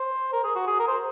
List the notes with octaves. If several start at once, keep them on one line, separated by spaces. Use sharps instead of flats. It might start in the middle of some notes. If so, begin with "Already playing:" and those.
Already playing: C5
A#4
G#4
F#4
G#4
A#4
C5